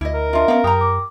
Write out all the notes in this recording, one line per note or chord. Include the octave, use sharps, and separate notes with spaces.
D2 E4 D#5
A#4
D4 F4 D#5 E5 C6
B3 C#4 D4 F5
F#2 G4 A#5 D#6
D6